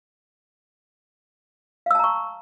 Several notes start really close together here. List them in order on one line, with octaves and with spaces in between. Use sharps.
F5 E6 A5 A#5 C#6